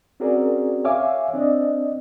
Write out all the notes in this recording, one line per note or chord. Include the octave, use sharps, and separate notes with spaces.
C4 C#4 F#4 G#4 A#4 D5
C#5 E5 F5 G#5 D6
C4 D4 D5 D#5